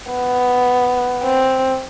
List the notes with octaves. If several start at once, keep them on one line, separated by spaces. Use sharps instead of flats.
B3
C4